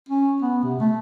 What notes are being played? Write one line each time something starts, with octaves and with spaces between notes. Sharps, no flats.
C#4
B3
C3
A3